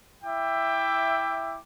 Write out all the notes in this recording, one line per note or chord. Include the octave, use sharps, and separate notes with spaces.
E4 E5 G5 D6